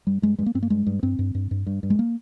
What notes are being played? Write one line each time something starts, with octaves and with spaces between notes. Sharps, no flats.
G2 G3
G2 G#3
G2 G#3
A#3
G2 C4
A#3
G2 G#3
G2
G2 C4
G2
G2
G2
G2
G2
G#3
A#3